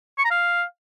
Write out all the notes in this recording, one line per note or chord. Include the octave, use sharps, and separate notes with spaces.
C#6
A#5
F5